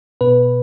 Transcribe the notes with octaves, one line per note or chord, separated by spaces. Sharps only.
B2 B4